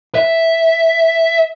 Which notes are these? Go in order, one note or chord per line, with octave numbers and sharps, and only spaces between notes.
E5